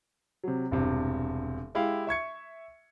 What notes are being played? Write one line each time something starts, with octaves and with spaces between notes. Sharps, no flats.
C3 F#3
E1 G2 C3
G#3 E4 G4 F5
E5 C#6 G#6 C#7